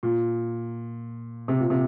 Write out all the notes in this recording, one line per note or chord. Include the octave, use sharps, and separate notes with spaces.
A#2
C3
A#2
C3